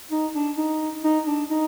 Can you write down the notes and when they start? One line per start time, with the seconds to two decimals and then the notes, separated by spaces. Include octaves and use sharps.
0.11 D#4
0.34 D4
0.57 D#4
1.04 D#4
1.27 D4
1.51 D#4